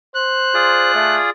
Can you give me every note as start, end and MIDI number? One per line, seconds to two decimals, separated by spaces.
0.15 0.94 72
0.15 1.15 90
0.54 1.30 65
0.54 1.30 68
0.54 1.30 74
0.94 1.18 57